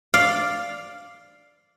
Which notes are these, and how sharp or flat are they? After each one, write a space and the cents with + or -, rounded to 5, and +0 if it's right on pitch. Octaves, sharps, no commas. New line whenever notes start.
D5 +0 F5 +0